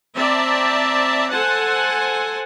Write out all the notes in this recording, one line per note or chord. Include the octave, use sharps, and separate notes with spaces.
C4 D5 E5 A5 A#5
A4 C5 F#5 G#5 A5